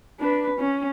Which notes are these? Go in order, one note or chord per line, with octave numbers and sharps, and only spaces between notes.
D4 B4
C#4